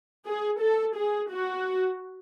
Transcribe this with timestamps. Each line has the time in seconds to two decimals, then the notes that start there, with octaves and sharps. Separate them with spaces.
0.26 G#4
0.61 A4
0.95 G#4
1.30 F#4